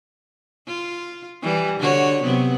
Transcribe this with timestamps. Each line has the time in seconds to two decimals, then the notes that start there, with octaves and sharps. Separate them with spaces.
0.67 F4
1.42 E3 G3
1.80 D3 F#4 C#5
2.21 C3 F#3 B3